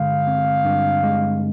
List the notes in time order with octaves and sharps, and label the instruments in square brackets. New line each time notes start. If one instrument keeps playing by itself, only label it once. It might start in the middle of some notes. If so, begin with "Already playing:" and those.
Already playing: [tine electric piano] G2 D3 G#3 [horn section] F5
[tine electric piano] C4
G2
G#3